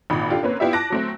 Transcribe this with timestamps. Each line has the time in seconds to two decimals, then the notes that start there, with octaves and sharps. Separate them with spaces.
0.10 G#1 A#2 D#3 B5
0.30 D4 F4 G4 A4
0.43 A#3 C4 C#4 B4
0.60 B3 E4 F4 G4 D5 E5
0.73 A5 D6 F#6 A#6 D7
0.90 F#3 A3 C4